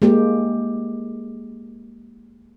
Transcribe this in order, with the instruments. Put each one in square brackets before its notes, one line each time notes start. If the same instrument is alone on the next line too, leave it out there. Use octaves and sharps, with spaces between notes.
[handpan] G#3 A#3 G4